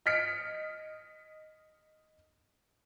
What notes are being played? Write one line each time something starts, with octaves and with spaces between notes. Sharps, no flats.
D#5 F6 B6 C#7 D7